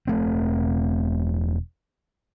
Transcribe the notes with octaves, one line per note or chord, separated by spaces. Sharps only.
E1 A3 C4